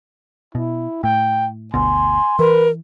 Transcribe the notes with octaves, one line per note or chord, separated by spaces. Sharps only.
B2 E4
A2 G5
G1 D2 B2 G#5 C6
E3 A#4 B4